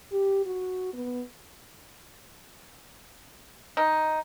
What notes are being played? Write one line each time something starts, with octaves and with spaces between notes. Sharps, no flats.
G4
F#4
B3
D#4